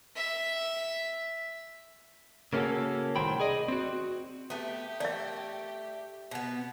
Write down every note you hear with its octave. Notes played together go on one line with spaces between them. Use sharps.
E5
C#3 A#3 C#4 F4 F#4 A4
C2 A2 D#3 C5 G5 B5
G#4 D5 D#5
C4 F#4
A3 B3 G4
A3 D5 E5
B2 B3